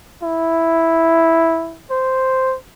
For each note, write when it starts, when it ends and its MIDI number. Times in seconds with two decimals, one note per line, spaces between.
0.22 1.80 64
1.90 2.56 72